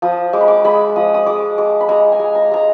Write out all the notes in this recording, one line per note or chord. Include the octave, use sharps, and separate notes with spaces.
F3 D#6
G#3 D6
B5
D6
G#3 B5
F3 D#6
D#6
G#3 D6
G#3 D6
B5
G#3 A#5
G#5
G#3
A#5
G#3 A#5